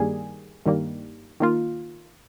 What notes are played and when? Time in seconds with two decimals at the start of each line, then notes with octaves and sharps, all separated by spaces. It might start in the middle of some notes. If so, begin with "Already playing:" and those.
Already playing: G2 D#3 G3 A#3 G#4
0.66 G2 D#3 G3 A#3
1.40 D#3 A#3 F4